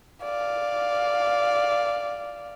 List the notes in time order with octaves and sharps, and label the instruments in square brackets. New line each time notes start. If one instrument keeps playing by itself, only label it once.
[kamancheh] D5 F5